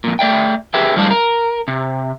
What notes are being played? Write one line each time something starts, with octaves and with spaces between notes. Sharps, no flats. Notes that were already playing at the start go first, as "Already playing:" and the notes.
F2 A#2
A3 D5 E5 G5
G4 G#4 B4 E5 G5
A2 F3 G3 G#3 D4 F4
A#4
C3